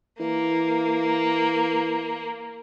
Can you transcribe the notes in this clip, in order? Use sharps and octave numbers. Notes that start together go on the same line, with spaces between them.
E3 A#3